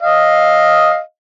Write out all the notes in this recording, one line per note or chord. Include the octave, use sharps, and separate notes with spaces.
D#5 F5